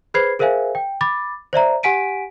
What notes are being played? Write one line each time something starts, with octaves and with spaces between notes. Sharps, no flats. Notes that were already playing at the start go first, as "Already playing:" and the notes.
G#4 B4 C5 B5 G#6 C7
G#4 A#4 C5 E5 F5 G#5
G5
B5 D6 A6
C5 D5 E5 A#5
G4 F#5 G#5 B6 D7 D#7